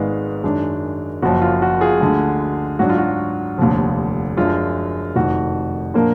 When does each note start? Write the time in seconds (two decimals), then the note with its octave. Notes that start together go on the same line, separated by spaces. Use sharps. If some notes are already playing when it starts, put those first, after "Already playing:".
Already playing: G#1 G#2 D#3 G#3 B3 D5 F5
0.44 F#2 D#3 G#3 D4
1.22 F#1 F#2 F3 F#4
1.42 F4
1.62 F#4
1.81 F4 G#4
2.00 D2 D3 G#3
2.79 G#2 F#3 D4 F#4
2.90 F4
2.98 F#4
3.58 F1 D#2 D3 F3
4.37 F#2 F3 G#3 D4 F4
5.16 F1 F2 D#3 F#4
5.94 A#2 F3 A#3 D4